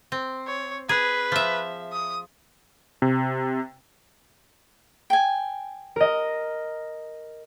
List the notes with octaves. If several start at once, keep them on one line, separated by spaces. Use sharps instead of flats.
C4
C#5
G#4 B4
F3 E5
D#6
C3
G5 G#5
A#4 D#5